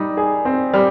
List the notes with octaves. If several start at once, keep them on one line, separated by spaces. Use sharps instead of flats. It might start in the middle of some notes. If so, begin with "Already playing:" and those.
Already playing: G3 D#4
G#4
C4
G3